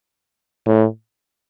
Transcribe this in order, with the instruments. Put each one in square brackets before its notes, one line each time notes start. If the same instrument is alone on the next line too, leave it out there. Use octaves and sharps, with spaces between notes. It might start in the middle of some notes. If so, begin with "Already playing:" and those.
[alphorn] A2